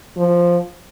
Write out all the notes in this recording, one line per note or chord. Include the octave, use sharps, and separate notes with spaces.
F3